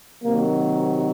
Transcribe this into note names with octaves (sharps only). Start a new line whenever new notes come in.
C3 D#3 F#3 A#3